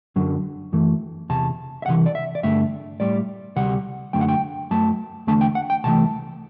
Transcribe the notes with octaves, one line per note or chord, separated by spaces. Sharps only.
F#2 D3 F#3
F#2 E3 A3
E2 C3 A5
E5
C2 C3 E3 F#5
D5
E5
D5
G2 D3 A3 E5
A2 G3 D5
D2 C3 G3 F#5
F#2 D3 F#3 A3 G5
F#5
G5
F#2 F#3 A3 A5
E2 D3 A3 A5
G5
F#5
G5
C2 C3 E3 A3 A5